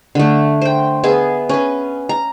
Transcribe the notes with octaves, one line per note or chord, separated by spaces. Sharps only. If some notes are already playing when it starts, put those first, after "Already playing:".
D3 A3
C5 G5
B3 G#4 E5
C#4 B4
A#5